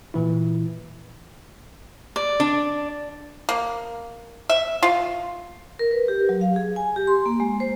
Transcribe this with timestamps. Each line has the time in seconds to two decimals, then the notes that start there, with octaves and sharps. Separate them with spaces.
0.14 A#2 E3 E4
2.16 D5
2.40 D4
3.49 A#3
4.50 E5
4.83 F4
5.79 A#4
5.91 B4
6.08 G4
6.29 F#3
6.41 F5
6.56 G#4
6.76 G#5
6.96 G4
7.07 C6
7.26 A#3
7.40 G#3
7.60 C5